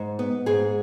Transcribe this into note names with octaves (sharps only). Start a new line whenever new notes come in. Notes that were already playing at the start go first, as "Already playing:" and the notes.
Already playing: G#2
B3
G#2 G#4